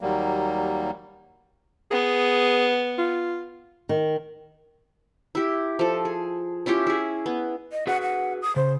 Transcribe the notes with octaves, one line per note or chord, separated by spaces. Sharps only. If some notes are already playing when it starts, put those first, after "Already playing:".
D#2 F#3 G3 A#3
B3 G#4
F4
D#3
E4 G4
F3 A4
G#4
C#4 E4 F4 G4
E4 G#4
B3
D#5
F#4 G#4 B4 F#5
F#5
D#6
C#3 C5